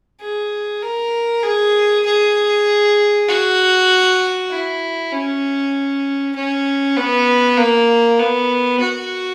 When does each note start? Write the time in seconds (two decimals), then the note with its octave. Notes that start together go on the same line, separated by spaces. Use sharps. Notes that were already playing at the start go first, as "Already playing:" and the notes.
0.21 G#4
0.83 A#4
1.43 G#4
2.06 G#4
3.28 F#4
4.51 E4
5.12 C#4
6.36 C#4
6.97 B3
7.58 A#3
8.19 B3
8.81 F#4